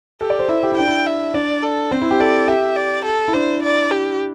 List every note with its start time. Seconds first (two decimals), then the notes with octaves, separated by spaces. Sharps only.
0.21 G4 A4
0.30 D5
0.39 C5
0.48 E4 E5
0.63 G4
0.72 E4
0.77 D4 G5
0.87 E4
1.06 E5
1.34 D4 D5
1.63 A4
1.91 C4 C5
2.01 E4
2.11 G4
2.20 A4 D5
2.48 G4 E5
2.76 D5
3.05 A4
3.28 E4
3.34 D4 C5
3.63 D5
3.91 G4